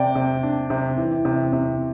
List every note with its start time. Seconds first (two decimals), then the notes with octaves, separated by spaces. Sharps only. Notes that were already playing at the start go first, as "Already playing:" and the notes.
Already playing: C3 D5 G5
0.15 C3
0.43 D4
0.70 C3
0.98 E3
1.25 C3
1.53 C3